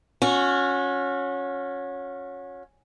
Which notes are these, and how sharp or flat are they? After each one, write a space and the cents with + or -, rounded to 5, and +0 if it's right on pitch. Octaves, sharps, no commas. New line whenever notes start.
C#4 +0 F#4 -30